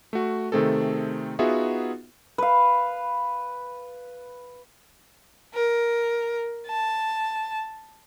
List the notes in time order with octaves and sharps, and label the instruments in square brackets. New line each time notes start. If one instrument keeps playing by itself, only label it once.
[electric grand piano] A3 F#4
C3 D#3 A3 C4 G#4 A4
B3 D#4 F4 F#4 G#4 E5
[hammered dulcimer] B4 F5
[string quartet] A#4
A5